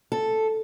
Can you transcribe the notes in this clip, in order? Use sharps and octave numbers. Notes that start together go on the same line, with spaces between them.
A4